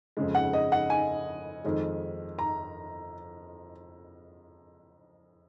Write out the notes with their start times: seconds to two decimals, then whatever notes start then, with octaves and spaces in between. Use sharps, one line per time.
0.17 F2 C#3 G#3
0.35 F#5
0.53 D#5
0.72 F#5
0.90 G#5
1.64 F2 D#3 G#3
2.39 A#5